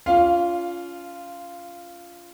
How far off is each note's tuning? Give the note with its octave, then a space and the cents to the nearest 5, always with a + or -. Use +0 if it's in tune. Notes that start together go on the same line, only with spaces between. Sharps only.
C#4 +35 F4 -10 F5 +10